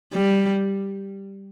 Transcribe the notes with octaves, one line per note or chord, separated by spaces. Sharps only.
G3